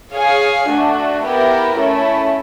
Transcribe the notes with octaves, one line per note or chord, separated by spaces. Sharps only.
G#4 C#5 F5 G#5
A3 D4 F#4
B3 E4 G4 A#4
A3 C#4 E4